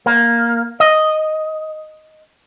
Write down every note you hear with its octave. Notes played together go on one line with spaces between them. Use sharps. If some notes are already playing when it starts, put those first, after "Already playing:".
A#3
D#5